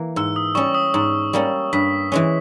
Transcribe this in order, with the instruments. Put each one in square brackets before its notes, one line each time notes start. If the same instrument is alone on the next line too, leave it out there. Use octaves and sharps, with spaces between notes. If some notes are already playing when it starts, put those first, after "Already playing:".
Already playing: [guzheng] E3 A#3
[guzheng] G#2 [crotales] E6
[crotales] D#6
[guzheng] G3 C#4 [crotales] C#6
[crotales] D#6
[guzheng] G#2 [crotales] D#6
[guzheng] G3 A#3 C#4
[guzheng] G2 [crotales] B6
[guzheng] E3 G#3 C#4